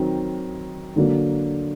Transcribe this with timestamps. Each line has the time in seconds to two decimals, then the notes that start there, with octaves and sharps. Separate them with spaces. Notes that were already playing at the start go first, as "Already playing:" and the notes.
Already playing: D#3 F#3 C4
0.96 D3 F#3 A#3